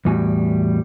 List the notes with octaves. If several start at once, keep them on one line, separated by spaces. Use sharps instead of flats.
E2 A2 G3 F#4 G#5